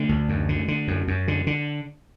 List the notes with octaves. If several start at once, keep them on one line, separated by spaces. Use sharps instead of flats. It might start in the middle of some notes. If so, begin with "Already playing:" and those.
Already playing: D3 A3
D2
F#2
D3
D3
F#2
F#2
D3
D3